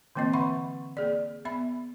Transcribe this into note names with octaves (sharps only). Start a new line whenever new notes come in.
D3 E3 A#3 C4 D#5
D3 E5 F#5 B5 C#6
A#3 G#4 D5
B3 E5 B5